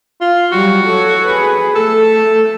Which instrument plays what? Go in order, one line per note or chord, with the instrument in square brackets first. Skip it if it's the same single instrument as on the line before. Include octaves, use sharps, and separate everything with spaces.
[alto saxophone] F4
[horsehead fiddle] F#3 G3 [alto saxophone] F#4
[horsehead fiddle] A4 C#5
G#4 B4
[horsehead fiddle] A3 [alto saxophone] A4